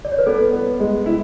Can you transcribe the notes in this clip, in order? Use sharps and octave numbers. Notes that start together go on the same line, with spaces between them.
D5
C#5
B4
B3 A4
B3
G#3
E4